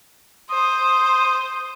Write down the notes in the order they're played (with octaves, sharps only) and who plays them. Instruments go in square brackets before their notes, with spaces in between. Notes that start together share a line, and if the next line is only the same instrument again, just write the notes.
[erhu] C5 [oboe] D#6